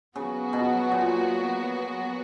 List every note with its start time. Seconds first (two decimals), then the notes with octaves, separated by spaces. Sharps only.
0.16 C#3 F#3 B3 F#4
0.53 B2
0.92 A#2